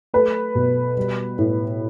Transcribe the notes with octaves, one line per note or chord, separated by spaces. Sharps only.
A3 B4
B2
G3
A2